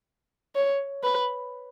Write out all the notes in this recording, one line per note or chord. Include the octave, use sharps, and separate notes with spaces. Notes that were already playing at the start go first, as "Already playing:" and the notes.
C#5
B4